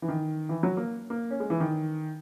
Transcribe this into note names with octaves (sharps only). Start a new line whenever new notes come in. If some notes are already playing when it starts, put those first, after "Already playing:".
E3
D#3
E3
F#3
A#3
A#3
C#4
G#3
E3
D#3